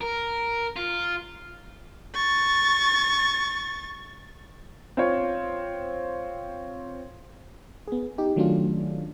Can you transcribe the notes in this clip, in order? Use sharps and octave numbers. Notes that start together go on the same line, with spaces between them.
A#4
F4
C#6 A6
C4 F4 C#5
B3 G#4
D#4 G4
D#3 F#3 A3 C#4 D4 F4